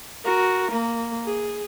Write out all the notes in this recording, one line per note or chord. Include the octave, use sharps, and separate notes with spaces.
F#4 A#4
A#3
G#4